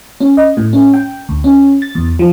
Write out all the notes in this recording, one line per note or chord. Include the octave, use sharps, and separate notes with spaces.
C#4
D#5
A2
C#4
G5
D2
C#4
A6
E2
F3